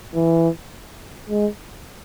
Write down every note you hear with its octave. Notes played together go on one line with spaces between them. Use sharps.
E3
G#3